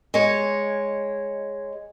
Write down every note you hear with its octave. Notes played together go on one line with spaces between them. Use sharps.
G#3 C#5